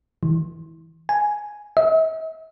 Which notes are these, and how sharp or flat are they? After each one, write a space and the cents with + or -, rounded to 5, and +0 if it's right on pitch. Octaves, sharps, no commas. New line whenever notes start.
E3 -25
G#5 +5
E5 -45